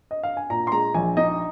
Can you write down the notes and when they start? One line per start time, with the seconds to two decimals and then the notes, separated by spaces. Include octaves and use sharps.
0.11 D#5
0.23 F5
0.37 G#5
0.50 A#2 A#5
0.67 C6
0.72 G#3 A#5
0.94 A#1 G#5
1.17 D#4 D#5